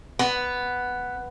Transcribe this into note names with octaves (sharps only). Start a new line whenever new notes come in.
B3